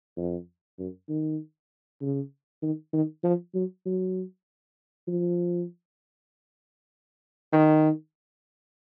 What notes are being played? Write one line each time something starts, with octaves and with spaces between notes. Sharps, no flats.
F2
F#2
D#3
C#3
D#3
D#3
F3
F#3
F#3
F3
D#3